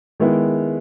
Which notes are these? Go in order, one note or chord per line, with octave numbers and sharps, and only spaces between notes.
D#3 G#3 B3 E4